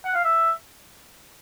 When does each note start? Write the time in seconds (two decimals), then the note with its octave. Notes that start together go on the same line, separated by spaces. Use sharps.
0.05 F#5
0.15 F5
0.24 E5